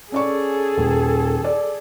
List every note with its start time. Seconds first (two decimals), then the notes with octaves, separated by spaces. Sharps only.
0.12 C#4 G#4 A4 D5 C#6
0.77 D#1
1.44 D5